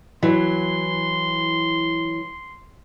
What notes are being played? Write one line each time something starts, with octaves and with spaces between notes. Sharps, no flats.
E3 F#3 C6